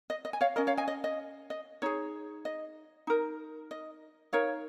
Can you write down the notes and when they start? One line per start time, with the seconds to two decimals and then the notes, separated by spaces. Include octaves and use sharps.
0.10 D#5
0.25 D#5
0.33 G#5
0.41 C#5 F5
0.56 C#4 A#4 D#5
0.67 C#5 F5
0.77 D#5 G#5
0.88 D#5
1.04 D#5
1.50 D#5
1.82 D#4 G#4 C#5
2.45 D#5
3.07 D#4 A#4
3.71 D#5
4.33 D#4 A#4 C#5 F5